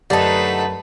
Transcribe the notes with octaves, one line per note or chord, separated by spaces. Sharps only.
F#2 D3 A3 D#4 G4 B4 A5